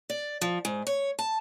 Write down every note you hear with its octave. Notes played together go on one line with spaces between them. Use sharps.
D5
F3
G#2
C#5
A5